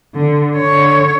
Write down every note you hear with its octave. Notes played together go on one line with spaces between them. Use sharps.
D3
D3 C#5